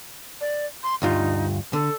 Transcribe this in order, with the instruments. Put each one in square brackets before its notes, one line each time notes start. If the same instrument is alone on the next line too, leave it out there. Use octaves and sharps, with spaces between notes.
[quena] D5
C6
[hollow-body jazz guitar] D2 G2 F4 [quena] D#4
[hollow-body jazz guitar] D3 [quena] A4